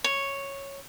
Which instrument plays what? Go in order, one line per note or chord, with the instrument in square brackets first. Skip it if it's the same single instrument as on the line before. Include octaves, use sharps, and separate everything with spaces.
[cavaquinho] C#5